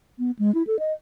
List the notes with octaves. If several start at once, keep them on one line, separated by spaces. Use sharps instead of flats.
B3
G#3
E4
A4
D#5